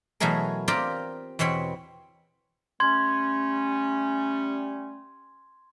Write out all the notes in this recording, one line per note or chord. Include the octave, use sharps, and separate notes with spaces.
B2 E3 F#3 A3 G#4 A#4
C4 F4 G4 A#4 D5
E2 B2 C4 C#5 B5
G3 A3 C#4 C6 G#6